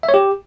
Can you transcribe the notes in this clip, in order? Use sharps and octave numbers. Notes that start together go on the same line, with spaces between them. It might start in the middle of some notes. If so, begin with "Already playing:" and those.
E5
C#5
G4